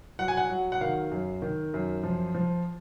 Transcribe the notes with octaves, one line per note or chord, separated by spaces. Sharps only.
F#3 F#5
G#5
F#5
F#3
F#5
D#3 F5
F#2
D#3
F#2
F3
F3